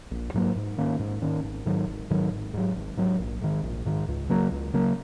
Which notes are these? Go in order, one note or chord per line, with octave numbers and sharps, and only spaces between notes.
A#1
G#2 F#3 A#3
G#2
D#3 A#3 C#4
G#2
D#3 A#3 C#4
G#1
G#2 D#3 F#3
G#1
G#2 D#3 F#3
G#1
G#2 F#3
G#1
G#2 F#3
A#1
G#2 D#3
A#1
G#2 D#3
C#2
C#3 F#3 A#3
C#2
C#3 F#3 A#3